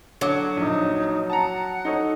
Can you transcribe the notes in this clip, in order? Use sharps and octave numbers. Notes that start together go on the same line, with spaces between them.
D3 F#3 C#5 D6
A#1 D#4
F#5 A5 A#5
D#4 A4 C#5